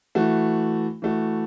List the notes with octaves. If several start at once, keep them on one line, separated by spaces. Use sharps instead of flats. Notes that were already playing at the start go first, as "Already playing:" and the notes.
E3 A3 F#4
E3 A3 F#4